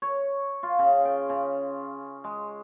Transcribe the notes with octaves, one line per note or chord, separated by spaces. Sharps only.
C#5
F4
C#3
G5
C#3
G#3